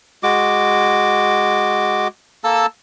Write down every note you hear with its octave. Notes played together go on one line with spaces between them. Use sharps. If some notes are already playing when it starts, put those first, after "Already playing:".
G#3 F#4 D6
A#3 A4 A5 E6